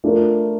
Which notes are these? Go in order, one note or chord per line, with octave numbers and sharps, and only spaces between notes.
A3 D4 F4 A#4